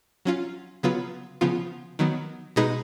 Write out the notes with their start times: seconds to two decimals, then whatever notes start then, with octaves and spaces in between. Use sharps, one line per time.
0.25 F#3 C#4 F4
0.83 C#3 F#3 B3 F4 B4
1.41 C#3 F3 B3 F4
1.99 D#3 F#3 B3
2.56 B2 G#3 D#4 G#4 B4